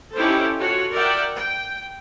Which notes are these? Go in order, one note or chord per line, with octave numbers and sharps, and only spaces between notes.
C#4 D#4 E4 G4 A4 C5
F4 F#4 A4 C#5
A#4 D5 E5 F#5 G5
G5